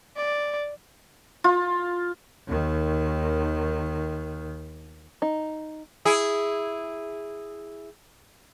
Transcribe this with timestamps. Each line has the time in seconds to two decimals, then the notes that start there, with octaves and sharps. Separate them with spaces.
0.16 D5
1.44 F4
2.47 D#2 D#3
5.22 D#4
6.05 E4 G#4